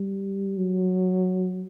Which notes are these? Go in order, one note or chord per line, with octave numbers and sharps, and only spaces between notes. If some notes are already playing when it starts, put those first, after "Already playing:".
Already playing: G3
F#3